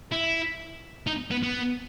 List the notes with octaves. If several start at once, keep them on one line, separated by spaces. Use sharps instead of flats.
E4
D#4
B3
B3